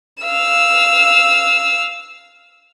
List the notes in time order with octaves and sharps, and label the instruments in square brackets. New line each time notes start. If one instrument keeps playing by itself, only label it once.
[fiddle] F5 E6